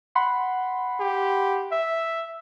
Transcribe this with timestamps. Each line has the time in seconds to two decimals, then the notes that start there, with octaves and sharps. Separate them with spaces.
0.15 F#5 B5 C6
1.00 G4
1.72 E5